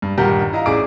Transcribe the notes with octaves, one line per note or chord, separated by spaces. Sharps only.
G2
D#1 G2 G4 A#4 F#5 G6
E4 D#5 F5 A#5
A1 E4 G#4 D5 D6 D7